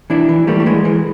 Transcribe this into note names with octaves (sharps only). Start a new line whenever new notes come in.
E3 D4 E4
E3
E3 G3 A3
A3
E3 G#3
E3